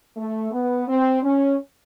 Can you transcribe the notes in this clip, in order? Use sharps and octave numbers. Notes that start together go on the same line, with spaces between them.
A3
B3
C4
C#4